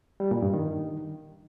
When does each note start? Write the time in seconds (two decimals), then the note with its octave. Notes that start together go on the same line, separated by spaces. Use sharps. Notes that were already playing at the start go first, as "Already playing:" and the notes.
0.20 G3
0.31 A#2
0.42 G2
0.54 D#3